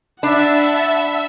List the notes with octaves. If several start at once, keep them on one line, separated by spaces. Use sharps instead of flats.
D4 E5 F#5 A5 B5